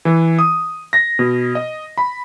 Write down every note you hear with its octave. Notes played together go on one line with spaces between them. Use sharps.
E3
D#6
A#6
B2
D#5
B5